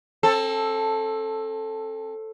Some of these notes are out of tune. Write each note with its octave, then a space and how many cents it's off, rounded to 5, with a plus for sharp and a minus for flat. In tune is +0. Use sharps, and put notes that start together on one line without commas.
C4 +40 A4 +0